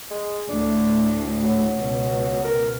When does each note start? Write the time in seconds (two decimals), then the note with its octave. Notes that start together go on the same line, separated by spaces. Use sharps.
0.11 G#3
0.49 D2 A2 D4
1.44 F#3
1.76 C#2 B2
2.44 A#4